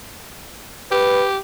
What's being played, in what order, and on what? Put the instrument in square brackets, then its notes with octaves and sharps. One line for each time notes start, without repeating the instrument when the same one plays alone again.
[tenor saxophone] G4 [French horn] B4